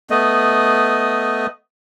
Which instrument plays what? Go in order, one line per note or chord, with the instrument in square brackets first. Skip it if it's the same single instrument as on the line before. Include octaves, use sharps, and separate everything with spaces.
[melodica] A3 B3 D#5